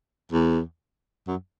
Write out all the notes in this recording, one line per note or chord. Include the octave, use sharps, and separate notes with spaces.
E2
F#2